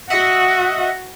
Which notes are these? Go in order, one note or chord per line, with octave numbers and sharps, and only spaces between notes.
F#4 D#5 E5 F#5